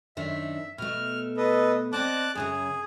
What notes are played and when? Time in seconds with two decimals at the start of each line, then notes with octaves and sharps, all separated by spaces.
0.17 F#2 D#3 D4 E5
0.78 B2 A3 F6
1.37 A4 B4 D#5
1.93 C4 D5 D#5 A5 D6 F#6
2.35 F#2 A#2 C#3 G#4